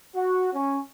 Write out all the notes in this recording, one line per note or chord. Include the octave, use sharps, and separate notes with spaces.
F#4
C#4